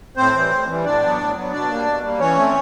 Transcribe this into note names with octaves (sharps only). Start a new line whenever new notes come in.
A2 C4 C5
E3 G3
A2
E3 G3
A2 D4 D5
F#3 B3
A2
F#3 B3
B2 D4 D5
G3 A#3
B2
G3 A#3
E3 C#4 C#5
A3 C4